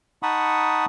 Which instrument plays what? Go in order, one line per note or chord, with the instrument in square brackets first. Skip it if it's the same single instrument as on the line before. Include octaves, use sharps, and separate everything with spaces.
[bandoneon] D#4 F#5 A5 B5 C#6 D#6